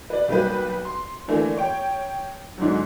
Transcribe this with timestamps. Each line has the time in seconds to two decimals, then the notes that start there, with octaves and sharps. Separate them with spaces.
0.10 B4 D5
0.28 B1 G3 A#3 G4 B4
0.85 C6
1.28 D3 E3 A3 A#3
1.58 C#5 G5
2.58 G#2 D3 F#3